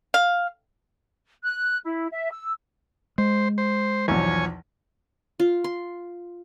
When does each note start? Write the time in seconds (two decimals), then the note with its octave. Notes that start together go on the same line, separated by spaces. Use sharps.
0.14 F5
1.44 F#6
1.84 E4
2.12 E5
2.31 E6
3.18 G#3 C5
3.58 C5
4.08 B1 E2 F3 C#5 G#5
5.40 F4
5.64 C6